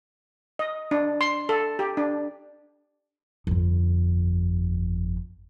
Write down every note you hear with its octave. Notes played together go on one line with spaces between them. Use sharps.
D#5
D4
C6
A4
G4
D4
G1 F2